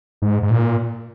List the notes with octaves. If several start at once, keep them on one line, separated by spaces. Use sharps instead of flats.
G#2
G#2
A#2